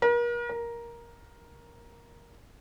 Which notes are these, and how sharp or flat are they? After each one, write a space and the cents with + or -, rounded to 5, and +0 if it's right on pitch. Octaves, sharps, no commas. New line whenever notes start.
A#4 +40
A#4 +10